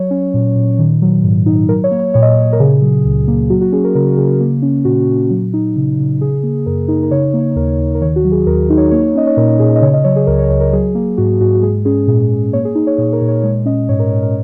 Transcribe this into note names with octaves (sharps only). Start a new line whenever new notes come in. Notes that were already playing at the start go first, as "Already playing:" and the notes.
Already playing: F#3 C#5
C#4
A#2
A#2
D#3
F#3
G#2
D#4
F#3 A#4
C#5
A#3
C#5
A#2 C#5
D#5
C#5
A#2
A#4
C#3 G#4
F#3
C#2
A#3
F#3 F#4
F#4
C#4 G#4
A#4
C#3 A#4
C#3 G#4
A#3
C#4
A#2 F#4
A#2
F#3
D#4
C#3
C#3
C#3 G#4
A#3
F#2 A#4
D#4 A#4
A#4
C#3 C#5
A#3
D#2 A#4
D#2
A#4
D#3 C#5
F#4
F#3
G#4
D#2 A#4
D#4
C#5
A#3 C#5
C#4 D#5
C#5
A#2 A#4
A#2 G#4
D#5
C#3 C#5
D#5
F#3 C#5
G#4
C#2 A#4
C#5
C#2 C#5
A#4
F#3 G#4
A#3
G#2 F#4
G#2 F#4
F#4
G#3 G#4
C#4 G#4
A#2 G#4
A#2
A#3 C#5
G#4
D#4 G#4
C#5
A#2 C#5
A#4
A#2
C#5
G#3 C#5
C#4 D#5
G#2 C#5
A#4
G#2 C#5
A#4